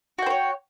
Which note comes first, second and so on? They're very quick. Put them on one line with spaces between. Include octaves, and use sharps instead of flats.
F#4 G5 C5 C#5